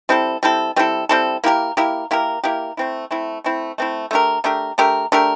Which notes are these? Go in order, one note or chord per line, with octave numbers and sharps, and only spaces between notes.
G3 C4 E4 A4
G3 C4 E4 A4
G3 C4 E4 A4
G3 C4 E4 A4
A#3 E4 G4 A#4
A#3 E4 G4 A#4
A#3 E4 G4 A#4
A#3 E4 G4 A#4
A3 C4 E4
A3 C4 E4
A3 C4 E4
A3 C4 E4
A3 D4 G4 A#4
A3 D4 G4 A#4
A3 D4 G4 A#4
A3 D4 G4 A#4